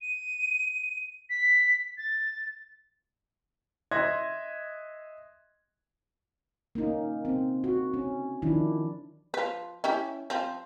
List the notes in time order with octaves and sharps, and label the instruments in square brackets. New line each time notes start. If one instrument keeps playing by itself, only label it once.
[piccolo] D#7
B6
A6
[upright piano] D#5 E5 C6 F#6 G#6 A#6
[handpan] A#3 C#4 D#4
C4
F#4
C#4
D#3 F3 D4 E4
[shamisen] F3 B4
C#4 E4 G4
F3 C4